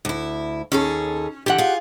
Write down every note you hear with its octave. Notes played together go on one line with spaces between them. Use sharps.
D2 E4
D#2 C#4 G#4 A4
D3 E3 G4 F#5
F4 G#4